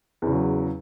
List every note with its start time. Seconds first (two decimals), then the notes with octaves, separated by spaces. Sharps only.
0.22 E2
0.27 C#3
0.32 F#3